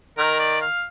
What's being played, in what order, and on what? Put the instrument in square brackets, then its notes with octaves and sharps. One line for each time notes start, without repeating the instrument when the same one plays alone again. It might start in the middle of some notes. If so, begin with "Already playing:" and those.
[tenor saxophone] D#3 [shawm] A#4
[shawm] D5
F5